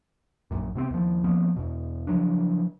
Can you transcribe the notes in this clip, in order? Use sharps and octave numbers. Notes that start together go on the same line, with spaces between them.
A#1 F#2 A#2
C3 B3 C4
D#2 F3
F3 A#3 B3 C#4
E2 B2
C#3 F3 F#3 D4